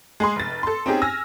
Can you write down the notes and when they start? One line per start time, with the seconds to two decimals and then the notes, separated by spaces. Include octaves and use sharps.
0.20 G#3 G#4 C6
0.36 F1 A6
0.63 A4 C6
0.86 C4 C#4 D#4 G4 G#4
1.02 G#5 E6 F6 A#6